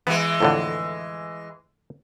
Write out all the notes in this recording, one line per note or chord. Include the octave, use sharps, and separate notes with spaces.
E3 G#3 B3
F2 A2 D3